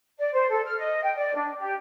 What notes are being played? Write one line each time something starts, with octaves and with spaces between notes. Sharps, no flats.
D5
C5
A4
F6
D#5
G5
D5
D4
G4